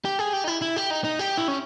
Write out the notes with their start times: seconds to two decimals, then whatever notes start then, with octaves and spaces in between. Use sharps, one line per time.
0.05 G4
0.19 G#4
0.33 G4
0.44 D#4
0.48 E4
0.62 E4
0.76 G4
0.91 D#4
1.04 D#4
1.19 G4
1.38 E4
1.48 C#4